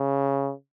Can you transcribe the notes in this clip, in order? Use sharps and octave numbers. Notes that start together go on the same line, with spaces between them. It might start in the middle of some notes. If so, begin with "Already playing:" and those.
Already playing: C#3